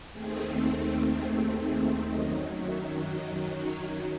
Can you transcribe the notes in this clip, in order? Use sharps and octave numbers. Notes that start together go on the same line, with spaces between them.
D#2 D#3 A3 C4 G#4
G#4
G#4
F#2 D#3 F#3 D#5
E5
D#5
C#5